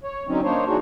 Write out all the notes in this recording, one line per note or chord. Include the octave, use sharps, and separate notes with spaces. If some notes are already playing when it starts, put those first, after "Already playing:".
C#5
D3 F#3 C4 C#4 D#4
A#3 D4 D#4 C5 C#5
E3 D4 D#4 F#4 G#4